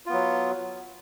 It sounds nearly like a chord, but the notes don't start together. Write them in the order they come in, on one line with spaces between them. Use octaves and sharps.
F4 B3 F#3